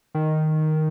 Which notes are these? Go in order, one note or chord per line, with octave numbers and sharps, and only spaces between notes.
D#3